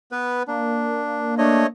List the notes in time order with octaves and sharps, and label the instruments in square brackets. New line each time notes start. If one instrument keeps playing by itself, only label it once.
[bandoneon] B3 B4
[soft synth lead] A#3 [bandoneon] D4
[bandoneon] A3 C#5 D#5 [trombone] D4